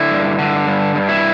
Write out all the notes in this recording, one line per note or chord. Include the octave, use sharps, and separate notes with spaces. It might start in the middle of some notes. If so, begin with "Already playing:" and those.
Already playing: D3 E4
G2
D3
G2
G2
E4